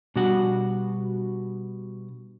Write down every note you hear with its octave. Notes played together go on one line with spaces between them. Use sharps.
B2 G3 D4 F#4 F#5